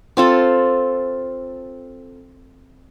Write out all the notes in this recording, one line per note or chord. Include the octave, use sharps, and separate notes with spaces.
C4 F4 A4